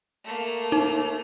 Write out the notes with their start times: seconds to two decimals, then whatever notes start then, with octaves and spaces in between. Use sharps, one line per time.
0.24 A3 A#3
0.72 D#4